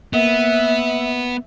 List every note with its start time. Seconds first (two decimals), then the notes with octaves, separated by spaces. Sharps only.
0.13 A#3 B3 E5